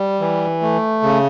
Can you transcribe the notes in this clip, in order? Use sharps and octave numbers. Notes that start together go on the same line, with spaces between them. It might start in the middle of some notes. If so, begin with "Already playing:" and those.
Already playing: G3
E3
A3
C#3